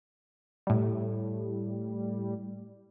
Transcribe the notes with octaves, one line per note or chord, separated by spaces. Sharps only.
A2 G3